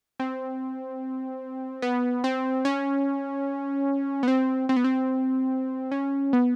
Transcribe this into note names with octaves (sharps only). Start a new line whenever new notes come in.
C4
B3
C4
C#4
B3
C4
C4
B3
C4
C#4
B3